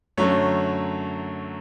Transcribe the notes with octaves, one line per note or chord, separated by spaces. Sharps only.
F#2 D3 F#3 A3 C#5